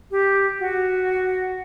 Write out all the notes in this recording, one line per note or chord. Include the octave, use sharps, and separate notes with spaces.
G4
F#4